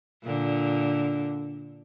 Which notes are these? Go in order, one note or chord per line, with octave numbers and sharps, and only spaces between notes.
A#2 D3